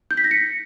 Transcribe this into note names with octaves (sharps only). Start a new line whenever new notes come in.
G6
B6
A#6
C#7